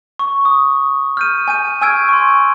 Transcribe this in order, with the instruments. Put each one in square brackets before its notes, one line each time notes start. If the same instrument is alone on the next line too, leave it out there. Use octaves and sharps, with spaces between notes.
[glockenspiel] C#6
D#6
F6 G6 D#7
G#5 G6 D#7
G#5 C#6 E6 F6 G#6 D7
C6 C#6